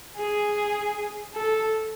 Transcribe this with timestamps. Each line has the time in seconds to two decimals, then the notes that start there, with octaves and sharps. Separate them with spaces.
0.17 G#4
1.35 A4